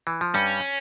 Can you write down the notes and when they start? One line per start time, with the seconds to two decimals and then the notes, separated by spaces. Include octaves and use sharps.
0.07 E3
0.21 F3
0.34 G2 G3 C#4